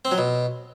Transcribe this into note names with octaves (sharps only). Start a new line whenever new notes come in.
C4
F#3
B2